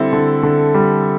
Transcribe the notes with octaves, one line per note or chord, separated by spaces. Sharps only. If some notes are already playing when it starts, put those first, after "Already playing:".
Already playing: D3 G3 C4 E4 A4
D3
D3
G3